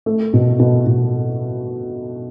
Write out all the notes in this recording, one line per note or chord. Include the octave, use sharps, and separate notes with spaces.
A3
B2
B2
B2